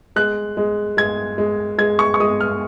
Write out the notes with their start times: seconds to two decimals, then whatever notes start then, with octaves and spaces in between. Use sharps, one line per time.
0.16 G#3 F#6
0.57 G#3
0.97 G#3 G#6
1.38 G#3
1.78 G#3 G#6
1.99 C#6
2.14 C#6
2.20 G#3 D#6
2.41 F6